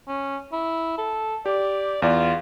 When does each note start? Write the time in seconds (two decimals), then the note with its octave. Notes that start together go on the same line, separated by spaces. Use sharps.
0.08 C#4
0.52 E4
0.98 A4
1.46 G4 D5
2.02 E2 F4 D5